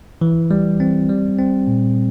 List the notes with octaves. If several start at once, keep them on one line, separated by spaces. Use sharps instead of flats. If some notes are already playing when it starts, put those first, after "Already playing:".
E3
G3
C4
G3
C4
A#2